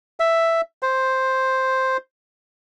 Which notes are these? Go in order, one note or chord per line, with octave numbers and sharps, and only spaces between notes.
E5
C5